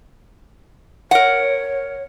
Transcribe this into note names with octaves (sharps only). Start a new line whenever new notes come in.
A#4 C#5 F#5